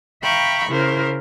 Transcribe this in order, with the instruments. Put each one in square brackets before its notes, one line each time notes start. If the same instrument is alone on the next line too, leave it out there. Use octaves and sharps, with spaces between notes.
[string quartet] E5 F5 G5 A#5 B5 C#6
C#3 E4 A#4 C5